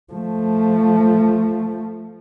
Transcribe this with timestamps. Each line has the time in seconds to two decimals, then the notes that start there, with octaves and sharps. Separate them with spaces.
0.13 F3 A3